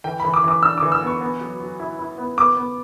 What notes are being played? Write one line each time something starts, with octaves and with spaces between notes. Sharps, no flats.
E3 G5
B5
E3
D6
E3 D6
D4 E6
D6
E3
E6
B3 C#6
B3
F#3
F#3
E4
E4
B3
B3 D6
B3